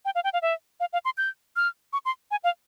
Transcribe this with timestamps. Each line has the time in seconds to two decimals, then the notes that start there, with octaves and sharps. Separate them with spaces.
0.05 G5
0.15 F5
0.24 G5
0.33 F5
0.42 E5
0.80 F5
0.93 F5
1.05 C6
1.18 G6
1.56 F6
1.93 C#6
2.05 C6
2.31 G#5
2.44 F5